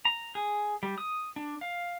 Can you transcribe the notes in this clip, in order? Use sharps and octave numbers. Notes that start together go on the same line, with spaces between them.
A#5
G#4
G3
D#6
D4
F5